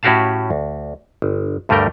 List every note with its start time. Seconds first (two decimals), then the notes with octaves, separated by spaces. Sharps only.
0.03 A2 C#4 F#4 G4 F5 A5
0.50 D2
1.22 G1
1.69 D2 G2 G3 A3 A#4 G5